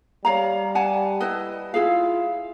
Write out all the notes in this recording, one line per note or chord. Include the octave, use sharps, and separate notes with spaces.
G3 C#5 F5 A#5
F#5 G#5 A5
E4 B4 D#5
E4 F4 G#4 F5